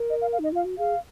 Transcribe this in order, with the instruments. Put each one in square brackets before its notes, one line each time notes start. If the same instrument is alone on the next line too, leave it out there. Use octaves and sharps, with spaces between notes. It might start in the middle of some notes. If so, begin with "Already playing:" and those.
Already playing: [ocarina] A#4
[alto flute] D#5
F5
F5
[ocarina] D#4 [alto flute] D#5
[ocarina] F4 [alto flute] F5
[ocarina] F#4
[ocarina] G#4 [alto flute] F5